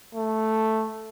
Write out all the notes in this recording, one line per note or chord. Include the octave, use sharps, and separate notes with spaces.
A3